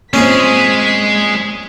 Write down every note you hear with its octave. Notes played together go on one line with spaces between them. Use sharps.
A#2 G#3 C4 C#4 G#4 B6